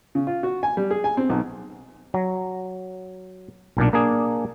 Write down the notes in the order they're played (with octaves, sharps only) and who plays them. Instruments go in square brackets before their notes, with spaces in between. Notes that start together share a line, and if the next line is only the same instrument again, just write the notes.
[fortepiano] C#3
F4
F#4
G#5
G3
G#4
G#5
C4
B1
[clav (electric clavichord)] F#3
B1 A#2 D4
A#3 D4 G#4